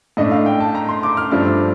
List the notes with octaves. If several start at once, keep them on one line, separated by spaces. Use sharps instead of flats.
A2 A3 D4 D#5
F5
G5
A5
A#5
C6
D6
F6
G2 F3 A3 D4 F6